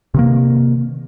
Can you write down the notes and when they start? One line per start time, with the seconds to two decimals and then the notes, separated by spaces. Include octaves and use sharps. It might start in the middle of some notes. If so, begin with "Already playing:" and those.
0.14 C3 D#3 A#3